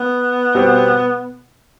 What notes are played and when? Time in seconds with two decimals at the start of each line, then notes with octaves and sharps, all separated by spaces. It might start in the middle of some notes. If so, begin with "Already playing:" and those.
Already playing: B3
0.55 B2 G3 C4